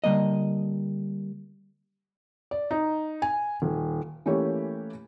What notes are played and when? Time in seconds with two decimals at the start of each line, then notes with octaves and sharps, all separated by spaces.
0.04 D3 G3 A#3 D#5
2.51 D5
2.71 D#4
3.22 G#5
3.62 D#1
4.26 E3 A3 A#3 C#4 G4 C#5